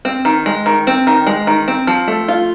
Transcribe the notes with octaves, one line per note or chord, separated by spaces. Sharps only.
C4
D#3
G#3
D#3
C4
D#3
G#3
D#3
C4
F3
A3
F4